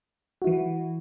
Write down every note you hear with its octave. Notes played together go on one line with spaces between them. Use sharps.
E3 E4 F#4